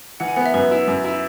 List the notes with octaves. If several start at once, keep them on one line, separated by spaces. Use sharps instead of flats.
E3 F#5
G#5
B3 F#5
E5
F#2 B4
E4
F#2
E4